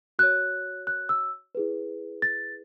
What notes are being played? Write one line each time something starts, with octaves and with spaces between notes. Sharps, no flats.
F#4 C#5 F#6
F#6
E6
E4 G#4 B4
A6